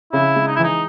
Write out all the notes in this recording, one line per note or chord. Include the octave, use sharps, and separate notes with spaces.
C#3 E4
G#3
D#4
E4
E3 D#4